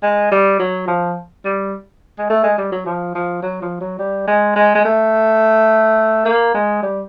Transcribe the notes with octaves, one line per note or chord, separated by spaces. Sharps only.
G#3
G3
F#3
F3
G3
G#3
A3
G#3
G3
F#3
F3
F3
F#3
F3
F#3
G3
G#3
G#3
G#3
A3
A#3
G#3
G3